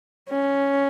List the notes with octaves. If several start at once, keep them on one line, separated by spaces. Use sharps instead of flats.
C#4